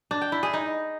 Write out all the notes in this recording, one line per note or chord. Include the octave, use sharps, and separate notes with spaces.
D4
G5
E4
G#4
D#4